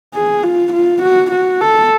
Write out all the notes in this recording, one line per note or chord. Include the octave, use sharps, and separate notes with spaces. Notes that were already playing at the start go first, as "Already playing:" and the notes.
G#4
F4
F4
F#4
F#4
A4